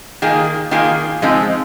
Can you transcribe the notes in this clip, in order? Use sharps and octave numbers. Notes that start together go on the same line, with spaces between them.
D#3 A#3 F4 G#4
D#3 A#3 F4 G#4
F3 G#3 C4 D#4